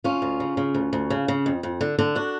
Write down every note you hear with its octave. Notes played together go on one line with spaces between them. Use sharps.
D2 C#4 F4
D2
C#3
C#3
D2
D2
C#3
C#3
F2
F2
D3
D3
D4 F#4